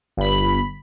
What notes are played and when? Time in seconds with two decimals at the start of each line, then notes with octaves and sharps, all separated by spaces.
0.17 G1 B5